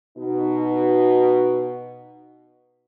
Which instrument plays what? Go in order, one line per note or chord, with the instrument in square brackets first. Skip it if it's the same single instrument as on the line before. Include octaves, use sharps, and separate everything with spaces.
[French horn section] B2 D#4